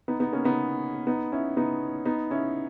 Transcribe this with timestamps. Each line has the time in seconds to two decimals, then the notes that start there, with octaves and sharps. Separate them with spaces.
0.08 B3 D#4
0.20 B3 D#4
0.32 A#3 C#4
0.45 B3 D#4
1.07 B3 D#4
1.32 C#4 E4
1.57 B3 D#4
2.05 B3 D#4
2.30 C#4 E4